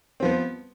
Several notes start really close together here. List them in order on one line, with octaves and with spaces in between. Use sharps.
C4 F3 B3